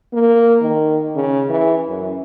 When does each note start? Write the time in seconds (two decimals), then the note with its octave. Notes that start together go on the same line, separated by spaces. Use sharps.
0.13 A#3
0.61 D#3
1.16 C#3
1.49 E3
1.89 F#2